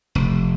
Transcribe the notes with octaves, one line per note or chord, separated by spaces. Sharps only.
F1